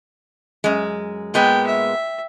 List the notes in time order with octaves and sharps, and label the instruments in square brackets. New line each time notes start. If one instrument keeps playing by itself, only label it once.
[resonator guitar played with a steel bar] F#2 G#3
[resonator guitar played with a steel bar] A#2 G#3 B3 [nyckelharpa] G5
[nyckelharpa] E5